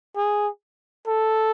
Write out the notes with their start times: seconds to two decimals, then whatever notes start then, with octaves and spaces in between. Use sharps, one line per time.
0.16 G#4
1.07 A4